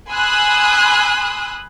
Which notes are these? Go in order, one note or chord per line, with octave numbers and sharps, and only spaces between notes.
G#5 B5 C6 D#6 E6 F#6